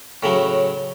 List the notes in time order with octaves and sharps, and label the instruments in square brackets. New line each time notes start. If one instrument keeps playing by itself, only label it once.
[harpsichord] A2 C#3 F#3